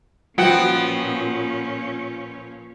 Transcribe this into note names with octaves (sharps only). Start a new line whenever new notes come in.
A#2 F3 B3 C#4 F#4 F#5 G5